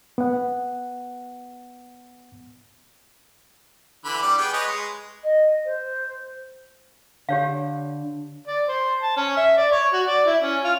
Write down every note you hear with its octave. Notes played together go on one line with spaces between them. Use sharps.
B3 F#5
D3 E3 B5
G3 D5 D6
B3 G#4 G5
B4 C#5 D#5
G#3
D#5
C5
D3 G4 C#5 F5
D5
C5
A5
C#4
E5
D5
C#5
F#4
D5
E4
C#4
F4